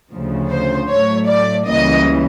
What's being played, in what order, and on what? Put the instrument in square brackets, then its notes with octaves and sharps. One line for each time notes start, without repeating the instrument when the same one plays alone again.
[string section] D2 C#3 F3
C5
A2 F#3 A3 C#5
D5
C#2 C#3 E3 G3 A#3 D#5